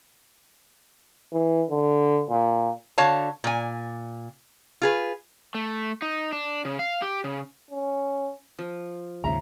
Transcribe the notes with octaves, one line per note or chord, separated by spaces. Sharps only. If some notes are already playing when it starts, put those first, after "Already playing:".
E3
D3
A#2
D3 F#4 C#5 F5 A5
A#2 G#5
F4 G#4 B4
A3
D#4
D4
C#3
F5
G4
C#3
C#4
F3
D#2 G#2 C#3 E5 A#5